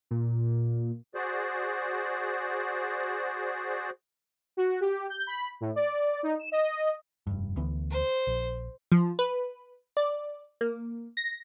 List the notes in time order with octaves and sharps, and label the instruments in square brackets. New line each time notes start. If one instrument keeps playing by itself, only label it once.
[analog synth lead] A#2
[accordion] F#4 G#4 C5 D5
[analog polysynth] F#4
G4
G6
B5
A2
D5
D#4
E7
D#5
[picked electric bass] F1 G2
D2 E3 B3
[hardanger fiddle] C5
[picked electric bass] A#1
[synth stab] F3
B4
D5
A#3
A#6